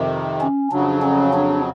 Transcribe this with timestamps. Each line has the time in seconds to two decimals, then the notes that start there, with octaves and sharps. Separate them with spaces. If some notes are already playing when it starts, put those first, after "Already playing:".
Already playing: F2 C3 D#3
0.41 C#4
0.71 F2 C#3 F#3 D4
1.02 C#4
1.33 D4